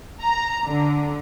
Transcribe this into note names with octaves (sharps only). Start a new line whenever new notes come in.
A#5
D3